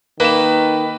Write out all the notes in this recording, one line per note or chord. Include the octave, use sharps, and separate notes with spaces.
D#3 A#3 B4 E7